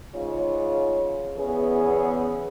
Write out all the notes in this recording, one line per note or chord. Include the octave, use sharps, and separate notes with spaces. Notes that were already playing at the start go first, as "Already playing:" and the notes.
G#2 C#3 F4 C#5
E2 B3 C#4 G#4